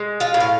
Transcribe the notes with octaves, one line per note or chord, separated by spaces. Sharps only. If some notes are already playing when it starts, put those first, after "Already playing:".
Already playing: G#3
F4 F5
A2
F5